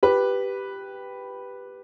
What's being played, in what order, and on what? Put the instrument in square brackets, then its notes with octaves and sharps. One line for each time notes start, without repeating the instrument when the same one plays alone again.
[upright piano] G4 B4